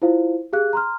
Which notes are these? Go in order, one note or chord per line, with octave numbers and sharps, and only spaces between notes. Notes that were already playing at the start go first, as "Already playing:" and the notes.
E4 F4 C5 F5
G4 G#4 F5 F#6
A#5 C6 F6